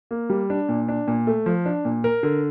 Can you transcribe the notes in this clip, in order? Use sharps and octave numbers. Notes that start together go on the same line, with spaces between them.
A#3
G3
D4
A#2
D4
A#2
A3
F3
D4
A#2
A#4
D3